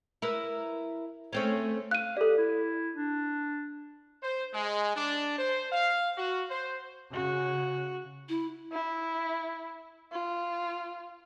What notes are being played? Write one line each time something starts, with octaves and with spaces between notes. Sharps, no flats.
E4 A#4 B4
A3 C4 C#4
F5 F#6 D#7
G4 A4 D5
E4
D4
C5
G#3
D4
C5
F5
F#4
C5
C#3 F#4
E4
E4
F4